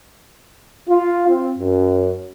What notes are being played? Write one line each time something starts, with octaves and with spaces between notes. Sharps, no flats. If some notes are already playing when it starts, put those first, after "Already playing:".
F4
C4
F#2